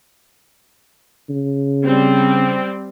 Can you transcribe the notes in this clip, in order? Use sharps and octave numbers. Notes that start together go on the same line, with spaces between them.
C#3
G3 C4